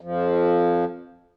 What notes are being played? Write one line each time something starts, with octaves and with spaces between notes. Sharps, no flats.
F2 F3